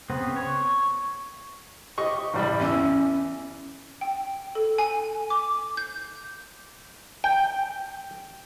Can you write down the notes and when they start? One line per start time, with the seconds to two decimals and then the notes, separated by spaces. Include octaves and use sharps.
0.10 C#3 B3 C4
0.36 C#5
1.98 G4 D#5 C#6
2.34 A1 G3 B5
2.61 E2 C#4 E6
4.01 G5
4.55 A4
4.78 G#5
5.30 D6
5.77 G6
7.24 G5